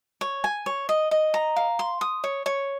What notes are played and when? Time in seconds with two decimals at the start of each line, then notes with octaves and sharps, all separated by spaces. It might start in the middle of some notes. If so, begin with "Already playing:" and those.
0.21 C#5
0.44 G#5
0.66 C#5
0.89 D#5
1.11 D#5
1.34 A#5
1.56 F5
1.79 C6
2.01 D#6
2.24 C#5
2.46 C#5